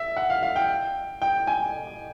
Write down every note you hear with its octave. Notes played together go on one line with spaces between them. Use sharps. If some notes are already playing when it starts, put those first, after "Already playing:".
Already playing: E5
F#5
F5
F5
G5
G5
G#5